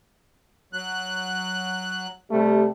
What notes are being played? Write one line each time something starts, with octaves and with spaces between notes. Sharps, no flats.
F#3 F#6
C3 G3 A3